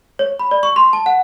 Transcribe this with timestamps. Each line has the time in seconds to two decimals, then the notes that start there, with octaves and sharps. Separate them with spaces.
0.19 C#5
0.39 B5
0.51 D5
0.63 C#6
0.76 C6
0.93 A5
1.06 F#5